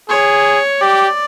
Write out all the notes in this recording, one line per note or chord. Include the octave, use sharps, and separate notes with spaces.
G#4 C#5
G4 D5